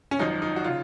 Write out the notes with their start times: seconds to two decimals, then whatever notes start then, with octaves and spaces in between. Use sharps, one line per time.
0.11 C#4
0.19 G#1 F#2 F3 D#4
0.42 D#4
0.56 F#4
0.64 C#3 F4